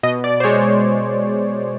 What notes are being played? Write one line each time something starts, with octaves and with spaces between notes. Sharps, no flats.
B2 D#5
D5
C5
G#3 C#5